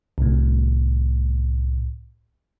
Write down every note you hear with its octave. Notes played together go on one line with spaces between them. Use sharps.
C2 A2